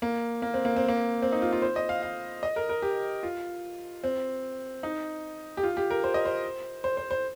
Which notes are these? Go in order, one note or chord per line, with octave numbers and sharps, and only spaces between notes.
A#3
A#3
C4
A#3
C4
A#3
C4
D#4
F4
F4
C5
D#5
F5
F5
D#5
A#4
A#4
G4
F4
C4
D#4
G4
F4
G4
A#4
C5
D#5
C5
C5
C5
C5